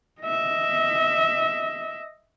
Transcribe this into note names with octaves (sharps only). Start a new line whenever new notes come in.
D#5 E5